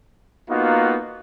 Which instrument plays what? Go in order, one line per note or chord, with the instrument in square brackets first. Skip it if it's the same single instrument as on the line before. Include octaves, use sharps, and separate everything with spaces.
[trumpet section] A#3 B3 D#4 F4 F#4